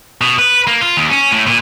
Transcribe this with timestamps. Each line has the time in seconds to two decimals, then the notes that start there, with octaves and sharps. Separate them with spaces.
0.21 B2
0.38 B4
0.67 A#3
0.81 F4
0.97 D#2
1.10 C#4
1.32 A2
1.47 A#2